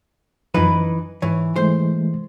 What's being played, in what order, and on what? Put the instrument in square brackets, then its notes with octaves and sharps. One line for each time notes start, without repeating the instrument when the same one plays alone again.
[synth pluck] F#2 F3 [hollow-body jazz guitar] E3 D#4 B4
[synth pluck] G#2 C#5 [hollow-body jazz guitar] E3
[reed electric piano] E3 G#3 A3 [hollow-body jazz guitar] C5